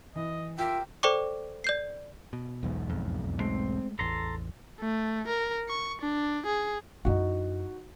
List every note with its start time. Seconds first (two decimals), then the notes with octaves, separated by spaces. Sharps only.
0.16 E3 D#5
0.58 F4 G4 A#4 C5 E5 G5
1.03 A4 C5 D5 G5 C#6 D6
1.64 D5 G6 C7
2.33 B2
2.63 B1 E2 G#2
2.90 F2
3.40 G#3 A3 C4
3.99 E1 A1 E2 A4 A#5 C6
4.80 A3
5.28 A#4
5.69 C#6
6.02 D4
6.46 G#4
7.05 F#2 D#4 E4 F#4